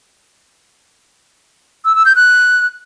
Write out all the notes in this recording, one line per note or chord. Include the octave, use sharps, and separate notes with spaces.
E6
E6
G6
F#6